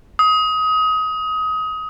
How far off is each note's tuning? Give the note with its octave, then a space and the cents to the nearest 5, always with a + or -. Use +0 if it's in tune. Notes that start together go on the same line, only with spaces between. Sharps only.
D#6 +25